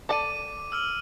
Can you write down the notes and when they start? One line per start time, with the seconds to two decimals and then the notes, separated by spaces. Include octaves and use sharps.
0.09 A4 D5 A5 D6 D#7
0.72 E6 F6 F#7